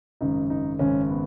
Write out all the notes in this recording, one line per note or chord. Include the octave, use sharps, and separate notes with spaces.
G#1 F#2 C#3 D#4
D#4
G#1 F#2 C#3 C#4
B3